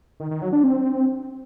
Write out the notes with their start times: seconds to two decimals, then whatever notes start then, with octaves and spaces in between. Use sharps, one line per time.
0.20 D#3
0.31 D#3
0.42 F#3
0.53 D4
0.64 C4